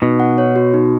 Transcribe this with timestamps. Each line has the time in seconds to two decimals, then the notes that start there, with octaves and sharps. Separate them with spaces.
0.02 B2 D#4
0.20 F#5
0.38 C#5
0.56 F#4
0.74 D#4